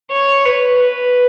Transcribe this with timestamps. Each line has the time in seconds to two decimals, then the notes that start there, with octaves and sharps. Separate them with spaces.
0.12 C#5
0.45 B4
0.80 B4